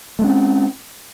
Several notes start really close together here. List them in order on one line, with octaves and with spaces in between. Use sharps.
A3 G#3 C#4 C4